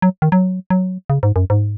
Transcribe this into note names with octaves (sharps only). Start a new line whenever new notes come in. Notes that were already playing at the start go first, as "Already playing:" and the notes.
F#3
D#3
F#3
F#3
C#3
G#2
F#2
G#2